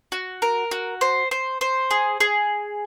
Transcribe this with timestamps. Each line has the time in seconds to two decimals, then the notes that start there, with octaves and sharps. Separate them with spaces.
0.12 F#4
0.42 A#4
0.71 F#4
1.01 C5
1.31 C5
1.61 C5
1.91 G#4
2.20 G#4